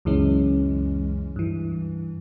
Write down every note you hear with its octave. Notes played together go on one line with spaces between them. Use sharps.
C#2 F#2 E3 G#3 C#4
G2 E3